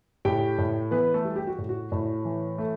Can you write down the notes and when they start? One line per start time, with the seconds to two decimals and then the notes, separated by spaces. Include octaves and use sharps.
0.25 A2 G4 G5
0.58 A2
0.91 E3 B3 B4
1.14 A3 A4
1.25 G3
1.36 G4
1.47 F#4
1.58 A2
1.69 F#4
1.92 A2
2.25 E3
2.58 A3